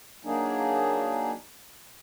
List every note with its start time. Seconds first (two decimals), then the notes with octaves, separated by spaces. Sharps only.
0.25 F#3 A#3 D4 D#4 G#4